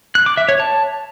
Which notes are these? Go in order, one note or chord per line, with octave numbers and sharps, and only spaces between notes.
F#6
D6
E5
C#5
A5